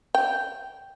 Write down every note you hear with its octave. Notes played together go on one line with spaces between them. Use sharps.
G5